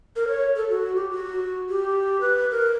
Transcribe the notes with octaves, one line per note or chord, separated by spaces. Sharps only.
A#4
C#5
A4
F#4
G4
F#4
G4
B4
A#4